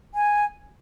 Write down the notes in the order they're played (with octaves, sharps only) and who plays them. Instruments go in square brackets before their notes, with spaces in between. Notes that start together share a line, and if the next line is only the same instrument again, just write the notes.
[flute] G#5